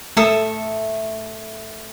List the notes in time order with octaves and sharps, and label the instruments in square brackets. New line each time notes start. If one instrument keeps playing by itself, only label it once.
[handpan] A3 [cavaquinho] A4 E5 D#6